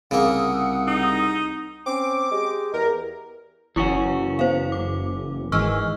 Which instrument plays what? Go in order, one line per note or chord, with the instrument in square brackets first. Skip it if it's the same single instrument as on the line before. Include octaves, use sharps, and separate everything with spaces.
[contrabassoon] C2 [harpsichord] C#3 A#3 [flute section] F#5 D#6 E6
[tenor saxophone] D#4
[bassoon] C4 [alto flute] C#4 [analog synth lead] D6
[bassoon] G#3 [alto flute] G4
[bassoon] E2 [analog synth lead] A#4
[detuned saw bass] F#1 [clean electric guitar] E3 C#4 F#4 [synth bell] E4 C#6
[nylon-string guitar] B3 [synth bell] C5 F5
[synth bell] D6
[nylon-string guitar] G#2 D#3 E3 [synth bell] C#6 E6 F6